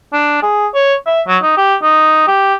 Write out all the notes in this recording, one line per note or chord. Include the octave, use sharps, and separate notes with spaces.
D4
G#4
C#5
E5
F#3
D#4
G4
D#4
G4